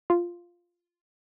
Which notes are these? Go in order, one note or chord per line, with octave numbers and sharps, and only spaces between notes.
F4